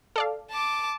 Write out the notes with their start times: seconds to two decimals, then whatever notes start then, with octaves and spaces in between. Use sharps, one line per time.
0.16 A4 D5 F5
0.51 A5 D6